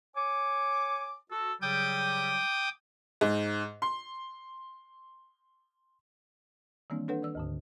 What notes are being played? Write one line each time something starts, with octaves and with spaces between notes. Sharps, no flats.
C#5 G#5 D6
F#4 A4
C#3 F#3 G3 G5 D6 D#6
G#2
C6
D#3 E3 G3 A#3 C4 D4
D4 A4 B4 C#5 F#5
D#3 D5 E6
D2 G#2 D3